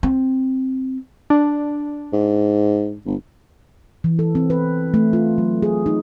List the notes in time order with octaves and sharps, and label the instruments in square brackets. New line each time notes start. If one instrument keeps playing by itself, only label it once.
[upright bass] C4
[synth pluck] D4
[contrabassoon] G#2
G1
[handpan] E3
A4
C4
B4
A3
F4
F#3
G#4
D#4